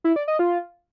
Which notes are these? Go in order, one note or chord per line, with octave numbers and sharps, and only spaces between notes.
E4
D5
D#5
F4